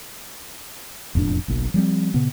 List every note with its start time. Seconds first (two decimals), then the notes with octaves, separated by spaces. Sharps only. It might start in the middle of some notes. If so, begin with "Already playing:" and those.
1.15 E1 F2 A2 D4
1.48 F#1 B1 F#2
1.74 F3 G3 C4
2.14 A#2 C#3 B3